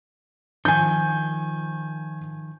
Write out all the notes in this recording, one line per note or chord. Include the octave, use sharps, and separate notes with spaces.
D#3 F3 G#5 G6